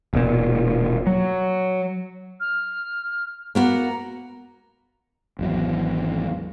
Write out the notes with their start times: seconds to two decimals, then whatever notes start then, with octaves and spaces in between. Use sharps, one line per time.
0.13 E1 A#2
1.07 F#3
2.40 F6
3.55 A#3 B3 F#4 A#5
5.39 G#1 E2 F#3